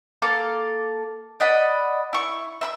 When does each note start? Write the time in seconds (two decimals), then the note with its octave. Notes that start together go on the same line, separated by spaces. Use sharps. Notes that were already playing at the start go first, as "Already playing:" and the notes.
0.22 A#3 A4 F5 D6
1.40 D5 D#5 F#5 B5
2.13 E4 C#6
2.61 E5 B5 E6